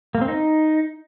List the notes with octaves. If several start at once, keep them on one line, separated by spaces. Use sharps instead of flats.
A#3
C4
D#4